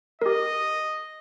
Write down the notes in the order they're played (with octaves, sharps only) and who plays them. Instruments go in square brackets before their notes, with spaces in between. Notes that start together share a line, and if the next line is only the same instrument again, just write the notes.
[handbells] G4 A#4 [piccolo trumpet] D#5